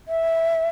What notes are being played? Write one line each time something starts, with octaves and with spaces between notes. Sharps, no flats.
E5